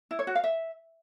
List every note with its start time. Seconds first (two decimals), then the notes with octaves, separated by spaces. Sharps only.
0.11 E4
0.19 C#5
0.27 F#4
0.35 F5
0.44 E5